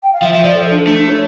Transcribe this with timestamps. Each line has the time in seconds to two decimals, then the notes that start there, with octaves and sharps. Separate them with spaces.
0.03 G5
0.13 F5
0.22 F3 E5
0.33 F3 E5
0.44 F3 D5
0.55 A4
0.71 D4
0.87 A3 D4
0.98 D4
1.09 C#5